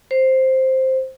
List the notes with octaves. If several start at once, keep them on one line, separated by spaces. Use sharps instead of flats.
C5